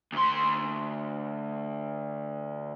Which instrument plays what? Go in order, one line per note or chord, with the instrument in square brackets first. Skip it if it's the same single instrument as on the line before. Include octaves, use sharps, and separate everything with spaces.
[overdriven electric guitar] D2 C6